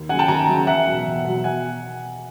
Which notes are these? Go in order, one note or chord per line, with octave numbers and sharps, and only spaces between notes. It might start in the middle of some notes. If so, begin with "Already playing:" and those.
Already playing: D#2
C#3 F#3 F#5 G#5
G5 A5
D#2 G#5 A#5
C#3 F#3
E2 E5 F#5
B2 F#3
E2
B2 F#3
F#5 G#5